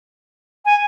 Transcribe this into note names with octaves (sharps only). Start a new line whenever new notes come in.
G#5